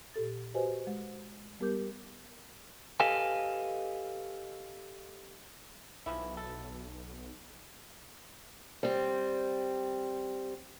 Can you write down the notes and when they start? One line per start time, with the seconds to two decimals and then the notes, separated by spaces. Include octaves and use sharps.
0.14 A#2 G4 A4 A6
0.54 F#4 G4 B4 C5 D#5 G#5
0.87 G#3
1.60 G3 B3 G4 A#4 D6 G6
3.00 G4 A4 B4 D#5 F5 G#5
6.06 B1 E3 F3 E4
6.37 A4
8.83 G3 C4